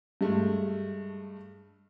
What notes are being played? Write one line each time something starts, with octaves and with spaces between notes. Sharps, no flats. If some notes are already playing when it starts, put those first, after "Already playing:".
G2 G#3 A3